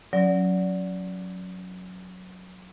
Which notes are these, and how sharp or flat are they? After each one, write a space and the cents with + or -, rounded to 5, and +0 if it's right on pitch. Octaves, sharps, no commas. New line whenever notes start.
F#3 -10 C#4 +0 D5 -20